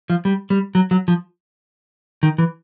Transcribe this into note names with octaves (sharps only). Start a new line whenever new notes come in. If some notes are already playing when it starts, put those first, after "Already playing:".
F3
G3
G3
F#3
F#3
F3
D#3
E3